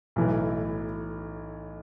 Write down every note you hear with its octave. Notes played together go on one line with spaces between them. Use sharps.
B1 A2 E3